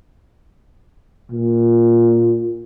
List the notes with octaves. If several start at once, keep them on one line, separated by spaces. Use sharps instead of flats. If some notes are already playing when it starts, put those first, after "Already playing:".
A#2